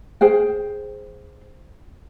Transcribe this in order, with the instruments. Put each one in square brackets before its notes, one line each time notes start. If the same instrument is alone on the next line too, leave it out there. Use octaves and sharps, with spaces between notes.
[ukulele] G#4 C5 G5